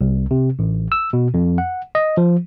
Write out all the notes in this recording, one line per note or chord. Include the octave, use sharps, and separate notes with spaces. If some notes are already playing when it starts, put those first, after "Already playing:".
C2
C3
A1
E6
B2
F2
F#5
D#5
F3